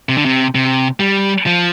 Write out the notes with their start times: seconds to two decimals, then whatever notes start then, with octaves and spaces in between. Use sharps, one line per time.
0.09 C3
0.17 D3
0.25 C3
0.55 C3
1.00 G3
1.46 F3